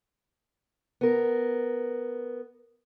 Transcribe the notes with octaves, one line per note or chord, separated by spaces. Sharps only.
B3 A#4